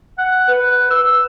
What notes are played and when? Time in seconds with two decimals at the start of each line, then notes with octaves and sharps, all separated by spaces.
0.18 F#5
0.48 B4
0.91 E6